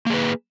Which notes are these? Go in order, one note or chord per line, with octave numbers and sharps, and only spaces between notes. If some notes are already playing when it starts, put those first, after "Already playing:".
A#3 G#4 B4